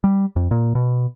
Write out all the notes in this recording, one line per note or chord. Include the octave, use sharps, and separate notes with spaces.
G3
F2
A#2
B2